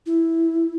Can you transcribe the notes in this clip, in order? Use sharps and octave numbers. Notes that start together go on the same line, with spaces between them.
E4